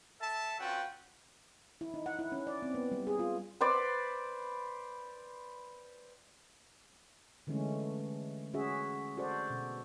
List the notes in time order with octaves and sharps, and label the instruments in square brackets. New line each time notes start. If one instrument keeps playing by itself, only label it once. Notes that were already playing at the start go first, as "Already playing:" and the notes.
[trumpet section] A4 E5 A5
C4 C#4 F4 F#4 B4 G5
[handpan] E4
D#4
F#5
E4
C#4
D5
C4
B3
G3
G#4
F4
[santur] B4 C5 D5
[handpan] D3 E3 G#3 A3 C#4
C#4 F#4 G#4 E5
F#4 A4 C5 D5
B2